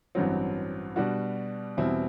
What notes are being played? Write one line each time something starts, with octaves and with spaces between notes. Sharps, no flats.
A1 G2 F#3 C4
B2 G3 D4 F#4
E2 B2 G3 C4 E4